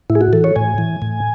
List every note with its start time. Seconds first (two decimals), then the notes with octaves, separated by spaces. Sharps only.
0.10 A2 E4
0.15 G#4
0.21 F#4
0.33 E3 A4
0.44 C#5
0.56 A2 G#5
0.78 E3
1.02 A2